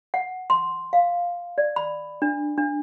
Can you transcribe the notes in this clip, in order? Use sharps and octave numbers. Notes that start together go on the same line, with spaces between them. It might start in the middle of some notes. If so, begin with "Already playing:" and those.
F#5
C6
F5
D5
B5
D4
D4